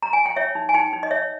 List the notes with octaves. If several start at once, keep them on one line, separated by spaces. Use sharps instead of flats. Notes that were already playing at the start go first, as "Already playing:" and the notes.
A#5
G#5
G5
C#5 E5
D#4
G#5
D#4 G5
D#4
D#5
C#5 E5